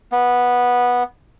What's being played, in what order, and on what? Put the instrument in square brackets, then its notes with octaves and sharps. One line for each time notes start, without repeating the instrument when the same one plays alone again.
[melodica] B3